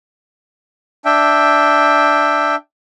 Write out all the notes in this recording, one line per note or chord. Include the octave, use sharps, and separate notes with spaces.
D4 E5 G5